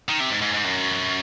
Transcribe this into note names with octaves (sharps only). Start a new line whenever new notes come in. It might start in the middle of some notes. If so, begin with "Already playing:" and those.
D#3
C3
G#2
G#2
G#2
F#2